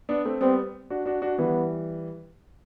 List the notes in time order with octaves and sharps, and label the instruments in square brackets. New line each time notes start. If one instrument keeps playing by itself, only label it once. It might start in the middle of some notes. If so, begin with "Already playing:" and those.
[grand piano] B3 D4
A3 C4
[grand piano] G3 B3 [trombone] C4
[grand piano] D4 F#4
D4 F#4
D4 F#4
[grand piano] E3 G3 [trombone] B3